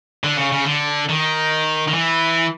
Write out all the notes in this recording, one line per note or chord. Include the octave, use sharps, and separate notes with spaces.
D3
C#3
C#3
D3
D#3
D#3
E3